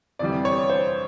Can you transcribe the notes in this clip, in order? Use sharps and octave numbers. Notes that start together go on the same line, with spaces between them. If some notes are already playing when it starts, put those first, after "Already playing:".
F2 C3 E3 G3 D5
C#5
C5